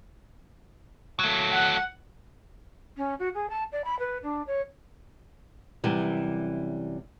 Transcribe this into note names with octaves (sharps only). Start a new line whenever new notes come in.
F#3 A3
F#5
C#4
F#4
G#4
A5
D5
B5
B4
D4
C#5
F#2 C3 E3 G3